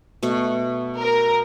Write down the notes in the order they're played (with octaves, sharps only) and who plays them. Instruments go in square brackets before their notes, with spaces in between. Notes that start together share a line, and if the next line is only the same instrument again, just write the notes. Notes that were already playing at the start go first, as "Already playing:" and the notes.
[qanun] B2 A3 C#6
[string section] A#4